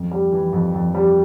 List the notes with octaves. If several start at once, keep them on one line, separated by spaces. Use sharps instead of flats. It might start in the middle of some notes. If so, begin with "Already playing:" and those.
Already playing: F2
G3
E3
F2
F2
G3